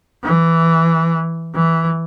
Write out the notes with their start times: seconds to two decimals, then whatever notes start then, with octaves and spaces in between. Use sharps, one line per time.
0.24 E3
1.55 E3